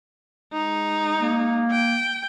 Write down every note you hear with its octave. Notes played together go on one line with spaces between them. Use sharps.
G#3 D#4
A#3
G5